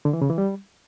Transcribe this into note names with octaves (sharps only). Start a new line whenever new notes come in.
D3
E3
C#3
E3
G3